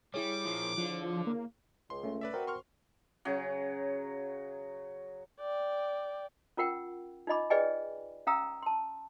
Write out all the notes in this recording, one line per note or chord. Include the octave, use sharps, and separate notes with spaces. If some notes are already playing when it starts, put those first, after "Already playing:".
G3 E4 G#4 C#5 D6
A#2 F3
D3 F3
A#3
C#2 C6
A3 C#4
B4 D5 E5
C4 F#4 A#4 G5
C6 C#6 F6
C#3 F#3
D5 G5
C#4 F4 A#4 F#5 G5
D#4 F4 D#5 B5 D6
G#4 B4 D5 D#5 G5 G#5
C#4 F5 G5 A#5 D#6 E6
A5 C6